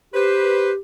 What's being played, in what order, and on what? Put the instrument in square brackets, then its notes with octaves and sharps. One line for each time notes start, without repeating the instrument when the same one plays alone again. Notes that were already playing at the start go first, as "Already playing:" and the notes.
[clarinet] G4 [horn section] B4 C5